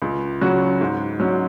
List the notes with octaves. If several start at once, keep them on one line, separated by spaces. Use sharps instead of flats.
C#2
C#3 F#3 C#4 F#4
G#2
F#3 C#4 F#4